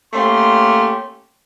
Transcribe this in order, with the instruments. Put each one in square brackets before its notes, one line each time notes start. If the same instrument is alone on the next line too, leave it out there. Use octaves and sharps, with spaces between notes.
[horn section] A3 A#3 C#4 G4 C6